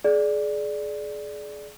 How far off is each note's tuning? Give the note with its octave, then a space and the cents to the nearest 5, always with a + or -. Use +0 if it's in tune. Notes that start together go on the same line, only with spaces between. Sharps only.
G#4 +30 D5 +0